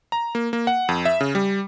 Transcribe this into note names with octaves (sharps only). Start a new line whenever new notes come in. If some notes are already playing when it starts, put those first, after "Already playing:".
A#5
A#3
A#3
F#5
F2
E5
C#3
G3